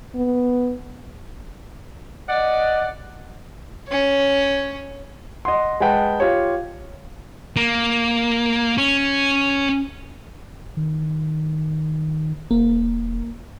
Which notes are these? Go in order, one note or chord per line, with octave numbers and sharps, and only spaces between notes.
B3
D5 D#5 F#5
C#4 C#5
D#5 F#5 C6
G#3 B4 F#5 G5 A5
F4 G4 C#5
A#3
C#4
D#3
E1 A#3